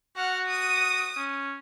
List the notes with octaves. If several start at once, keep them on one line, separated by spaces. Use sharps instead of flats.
F#4 F#5 F6
D#6 D#7
C#4